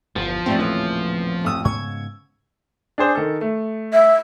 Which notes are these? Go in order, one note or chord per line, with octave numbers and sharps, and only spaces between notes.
G1 E2 F3
D#1 A1 G3 A3 C4 A4
C#3 E3 C4
A1 F2 A3 D#6 E6
G#2 C#3 B3 C#6 G#6
D4 G#4 C5
D#3 A4
A3
E5